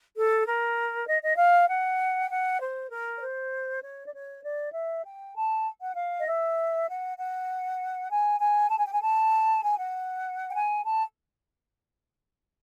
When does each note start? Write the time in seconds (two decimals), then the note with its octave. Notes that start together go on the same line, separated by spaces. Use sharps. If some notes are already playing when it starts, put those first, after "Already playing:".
0.15 A4
0.45 A#4
1.06 D#5
1.23 D#5
1.37 F5
1.68 F#5
2.20 G5
2.30 F#5
2.59 C5
2.90 A#4
3.16 C#5
3.21 C5
3.82 C#5
4.07 D5
4.13 C#5
4.43 D5
4.73 E5
5.04 G5
5.34 A5
5.80 F#5
5.95 F5
6.19 D#5
6.26 E5
6.87 F#5
7.17 F#5
8.09 G#5
8.39 G#5
8.70 A5
8.77 G#5
8.85 G5
8.92 G#5
9.01 A5
9.62 G#5
9.78 F#5
10.49 G5
10.54 G#5
10.85 A5